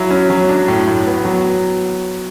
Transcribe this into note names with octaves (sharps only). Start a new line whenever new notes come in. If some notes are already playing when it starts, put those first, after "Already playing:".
Already playing: F#3 E4
C#4
F#3
D4
A2
A2
B3
F#3